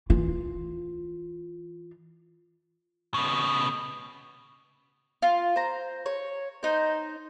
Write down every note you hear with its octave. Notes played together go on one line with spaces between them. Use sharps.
E3 F4
C#3 B3
F4
C5 A#5
C#5
D#4 C5